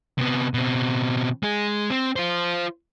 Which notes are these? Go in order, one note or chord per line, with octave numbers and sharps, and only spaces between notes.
C3 B3
B2 C4
G#3 G#4
C4
F4 C5